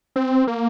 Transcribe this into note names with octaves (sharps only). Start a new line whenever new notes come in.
C4
A#3